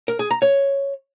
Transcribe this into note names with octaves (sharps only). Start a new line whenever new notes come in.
A#4
G#4
A#5
C#5